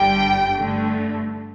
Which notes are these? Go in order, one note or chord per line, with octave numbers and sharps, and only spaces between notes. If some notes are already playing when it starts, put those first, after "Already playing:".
Already playing: G1 G2 D3 G3 G5
G2 D3 A3